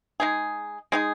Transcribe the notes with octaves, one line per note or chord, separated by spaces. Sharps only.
G#3 D#4 G#4
G#3 D#4 G#4